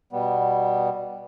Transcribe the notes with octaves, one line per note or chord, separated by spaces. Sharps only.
B2 G3 B3